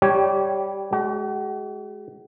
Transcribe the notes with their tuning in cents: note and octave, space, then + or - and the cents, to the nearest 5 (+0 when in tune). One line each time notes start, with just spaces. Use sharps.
G3 +0 G4 -20 C#5 +0
G#3 +20 F#4 +45